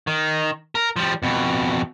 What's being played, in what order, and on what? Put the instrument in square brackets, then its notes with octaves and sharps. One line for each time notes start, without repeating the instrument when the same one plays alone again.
[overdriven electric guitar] D#3
A#4
F3 G3
F2 B2